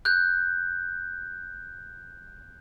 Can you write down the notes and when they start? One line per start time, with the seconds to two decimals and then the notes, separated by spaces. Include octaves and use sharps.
0.05 F#6 G6